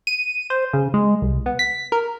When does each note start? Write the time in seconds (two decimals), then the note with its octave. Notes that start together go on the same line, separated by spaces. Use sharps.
0.07 D#7
0.50 C5
0.73 C#3
0.94 G#3
1.22 C2
1.46 B3
1.59 B6
1.92 A#4